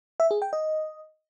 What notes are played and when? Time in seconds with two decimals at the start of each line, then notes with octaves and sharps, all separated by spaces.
0.20 E5
0.31 G#4
0.42 G5
0.53 D#5